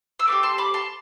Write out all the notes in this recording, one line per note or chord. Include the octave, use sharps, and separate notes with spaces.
E6
A3 C4 G4 D6
A5 C6
B5 D6
A5 C6